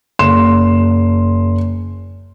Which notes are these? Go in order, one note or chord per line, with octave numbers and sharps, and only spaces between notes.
F#1 C6 E7